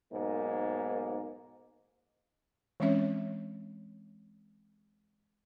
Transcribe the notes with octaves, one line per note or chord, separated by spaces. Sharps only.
B1 G#2 A#3
E3 G#3 C4 C#4 C#5 E5